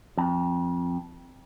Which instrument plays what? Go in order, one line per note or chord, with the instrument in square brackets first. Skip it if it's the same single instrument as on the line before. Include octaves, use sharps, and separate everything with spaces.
[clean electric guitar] F2